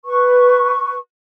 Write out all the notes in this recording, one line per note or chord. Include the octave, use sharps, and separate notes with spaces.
B4 C#6